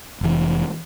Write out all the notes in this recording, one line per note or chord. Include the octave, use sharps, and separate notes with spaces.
F1 E3